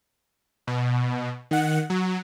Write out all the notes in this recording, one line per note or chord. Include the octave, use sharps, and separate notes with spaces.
B2
D#3 F#5
F#3